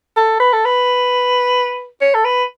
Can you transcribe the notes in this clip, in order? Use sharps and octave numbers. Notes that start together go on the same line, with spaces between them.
A4
B4
A4
B4
C#5
A4
B4